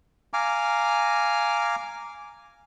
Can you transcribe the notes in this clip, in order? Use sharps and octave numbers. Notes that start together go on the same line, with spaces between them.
F5 G#5 A#5 D6